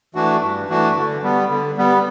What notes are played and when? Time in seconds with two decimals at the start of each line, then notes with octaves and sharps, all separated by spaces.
0.15 E3 A3 D4 F#4
0.42 G2
0.69 E3 A3 D4 F#4
0.96 D3
1.23 G3 B3
1.49 D3
1.77 G3 B3